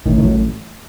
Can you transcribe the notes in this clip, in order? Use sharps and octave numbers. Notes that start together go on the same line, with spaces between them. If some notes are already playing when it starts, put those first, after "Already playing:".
A1 A2 D#3
D#3
F#3